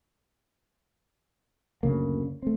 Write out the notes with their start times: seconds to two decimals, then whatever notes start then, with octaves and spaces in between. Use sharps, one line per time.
1.83 F#1 D2 C#3 A#3
2.42 A3 C4